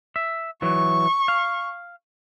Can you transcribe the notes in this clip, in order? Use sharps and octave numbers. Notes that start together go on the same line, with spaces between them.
E5
E3 F#3 C#6
F5